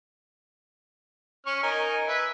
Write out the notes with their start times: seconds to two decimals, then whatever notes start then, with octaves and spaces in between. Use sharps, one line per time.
1.46 C#4 C#6 F6
1.63 D#4 A#4 G#5
2.08 B4 E5